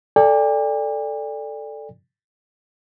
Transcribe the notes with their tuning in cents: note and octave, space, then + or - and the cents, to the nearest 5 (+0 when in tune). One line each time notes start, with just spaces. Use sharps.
A4 +0 D5 +0 G5 +45